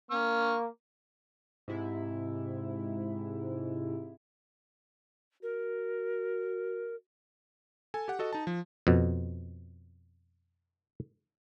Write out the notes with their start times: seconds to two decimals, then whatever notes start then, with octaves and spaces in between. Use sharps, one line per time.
0.11 A#3 C#6 F6
1.68 G#2 C3 E4
5.43 F#4 A#4
7.94 A4 G#5
8.08 G4 F#5
8.19 F#4 A4 D#5
8.33 D#4 A5
8.47 F3
8.87 F2 B2